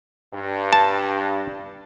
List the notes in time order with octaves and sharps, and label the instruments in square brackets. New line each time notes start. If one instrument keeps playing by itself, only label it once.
[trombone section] G2
[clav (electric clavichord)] A5